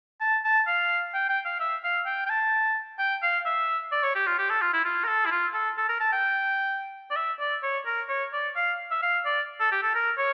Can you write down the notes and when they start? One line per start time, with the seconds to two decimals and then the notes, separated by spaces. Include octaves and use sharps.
0.21 A5
0.45 A5
0.67 F5
1.14 G5
1.29 G5
1.45 F5
1.60 E5
1.84 F5
2.06 G5
2.26 G5
2.30 A5
2.99 G5
3.22 F5
3.46 E5
3.92 D5
4.03 C#5
4.15 G4
4.27 F4
4.39 G4
4.50 A4
4.61 F4
4.74 E4
4.85 F4
5.04 A#4
5.08 A4
5.26 E4
5.31 F4
5.54 A4
5.78 A4
5.89 A#4
6.00 A5
6.12 G5
7.11 D5
7.16 E5
7.39 D5
7.63 C#5
7.86 A#4
8.09 C#5
8.33 D5
8.56 F5
8.91 E5
9.02 F5
9.25 D5
9.60 A4
9.72 G4
9.83 A4
9.95 A#4
10.18 C#5